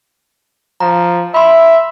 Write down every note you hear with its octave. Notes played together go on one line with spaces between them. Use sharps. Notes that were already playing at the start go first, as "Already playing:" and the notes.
F3 A#5
E5 B5 C6